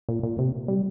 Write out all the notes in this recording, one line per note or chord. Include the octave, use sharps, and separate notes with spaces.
A#2
A#2
C3
G3